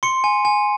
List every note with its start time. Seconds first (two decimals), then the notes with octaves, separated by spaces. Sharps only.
0.03 C6 C#7
0.24 G#5
0.45 G#5